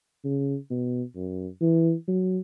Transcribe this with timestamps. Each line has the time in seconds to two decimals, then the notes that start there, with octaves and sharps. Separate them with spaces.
0.25 C#3
0.70 B2
1.16 F#2
1.62 E3
2.08 F#3